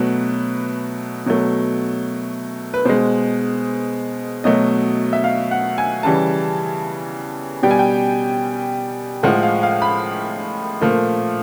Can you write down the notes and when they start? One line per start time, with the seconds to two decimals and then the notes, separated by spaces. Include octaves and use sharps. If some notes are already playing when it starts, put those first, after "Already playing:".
Already playing: B2 F#3 A3 B4
1.26 B2 F#3 A3
2.74 B4
2.85 B2 G#3 C5
4.44 B2 F#3 A3 D#5
5.13 E5
5.24 F5
5.51 F#5
5.78 G#5
6.03 C#3 E3 G3 A5
7.63 B2 G3 G5
7.71 G#5
7.79 G5
9.23 A2 F3 G#3 F#5
9.43 F5
9.63 F5
9.82 B5
10.81 A#2 F3 A3